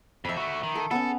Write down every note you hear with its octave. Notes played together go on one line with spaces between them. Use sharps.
F2 E5 B5
A3 F#4
D#3
A4
B3 C#4 A4